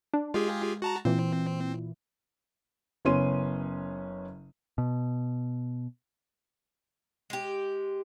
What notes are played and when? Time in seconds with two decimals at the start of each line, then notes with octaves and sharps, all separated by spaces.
0.14 D4
0.34 G#3 F4 G4 G#4
0.82 F#4 A5 A#5
1.05 A#2 E3 C4
3.05 F#1 B3 C#4 C6 D#7
4.78 B2
7.30 G#3 G4